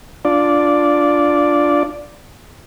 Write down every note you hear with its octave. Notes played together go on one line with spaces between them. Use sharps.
D4 F4 D5